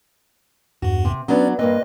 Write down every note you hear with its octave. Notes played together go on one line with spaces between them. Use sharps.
E2 G2 F#4
C3
F#3 B3 C#4 D4 D5
G2 A#3 C4 B4 D#5